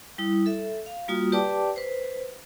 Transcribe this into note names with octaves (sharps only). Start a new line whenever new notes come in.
G3 E4 D#6
A4 E5
F5
G3 A#3 F4 F#4 D#6
G4 B4 D5 G5 A5 D6
B4 C5